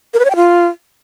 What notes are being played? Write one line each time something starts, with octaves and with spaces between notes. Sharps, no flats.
A#4
B4
C#5
G5
F4